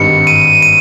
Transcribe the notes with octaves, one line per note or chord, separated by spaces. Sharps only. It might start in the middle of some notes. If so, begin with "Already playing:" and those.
Already playing: G#1 G2 D#3 G3 C#7
D#7
D#7